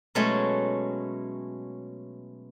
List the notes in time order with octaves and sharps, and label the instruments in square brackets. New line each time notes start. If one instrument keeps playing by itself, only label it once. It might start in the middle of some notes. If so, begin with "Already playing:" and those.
[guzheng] B2 F#3 G#3 A3 C#4